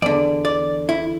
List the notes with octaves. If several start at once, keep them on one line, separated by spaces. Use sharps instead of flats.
E2 D3 D5
D5
E4